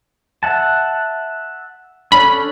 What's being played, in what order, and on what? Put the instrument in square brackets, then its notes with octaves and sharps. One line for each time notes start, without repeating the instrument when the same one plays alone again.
[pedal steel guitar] E5 F#5 A5
[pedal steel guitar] C#4 D4 A4 [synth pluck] B5